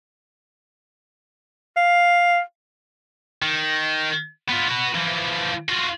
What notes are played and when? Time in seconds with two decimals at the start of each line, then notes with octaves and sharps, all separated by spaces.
1.77 F5
3.42 D#3
4.50 B3 F4
4.69 F#4 B4
4.95 E3 F3
5.69 F4 F#4